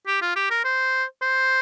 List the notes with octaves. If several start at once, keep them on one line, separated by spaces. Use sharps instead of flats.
G4
F4
G4
A#4
C5
C5